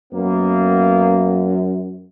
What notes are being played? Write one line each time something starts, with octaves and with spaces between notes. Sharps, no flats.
F#2 A#3 B3